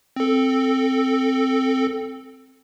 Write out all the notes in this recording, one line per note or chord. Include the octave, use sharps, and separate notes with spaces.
C4 A4